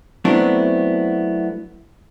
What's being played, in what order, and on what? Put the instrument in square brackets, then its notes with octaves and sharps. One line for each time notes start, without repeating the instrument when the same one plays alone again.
[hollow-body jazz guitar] F#3 A3 B3 C4 D4 E4